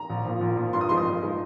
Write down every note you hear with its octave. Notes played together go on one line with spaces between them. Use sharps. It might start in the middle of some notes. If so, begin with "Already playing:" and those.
Already playing: A#5
A#1
A#2 F3
A#1
A#2 F3
G2 C6
D#6
F3 G#3 D#4 C6
D#6
G2
F3 G#3 D#4